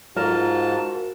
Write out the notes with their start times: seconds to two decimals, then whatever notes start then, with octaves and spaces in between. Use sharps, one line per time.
0.16 G#2 F4 F#4 A#4 A5